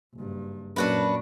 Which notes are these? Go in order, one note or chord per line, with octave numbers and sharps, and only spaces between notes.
F#1 G2
F#2 A#2 A#3 D4 F#4 B4